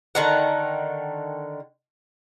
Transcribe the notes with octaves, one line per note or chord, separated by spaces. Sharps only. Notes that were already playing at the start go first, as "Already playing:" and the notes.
D3 D#3 F#5